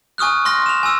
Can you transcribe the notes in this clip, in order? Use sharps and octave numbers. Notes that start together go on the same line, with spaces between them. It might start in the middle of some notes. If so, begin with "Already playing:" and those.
G#5 C#6 D#6 F6 F#6
C6 F6 A#6
E7 F7
G#5 E6